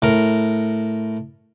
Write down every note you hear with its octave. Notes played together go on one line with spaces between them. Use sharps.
A2 A#4